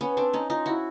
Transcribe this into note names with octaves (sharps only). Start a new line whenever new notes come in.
B3 C#4
C4 D4
C#4 D#4
D#4 F4
E4 F#4